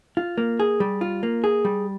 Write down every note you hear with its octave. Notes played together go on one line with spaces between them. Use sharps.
F4
A#3
G#4
G3
F4
A#3
G#4
G3